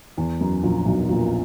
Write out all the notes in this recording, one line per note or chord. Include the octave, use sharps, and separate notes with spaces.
E2
F#2
A#1 A#2
B1 B2
A#1 A#2